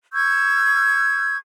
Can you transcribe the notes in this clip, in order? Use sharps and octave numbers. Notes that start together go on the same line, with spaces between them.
C#6 E6 G6 G#6